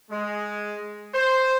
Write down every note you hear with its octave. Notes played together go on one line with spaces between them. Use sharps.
G#3
C5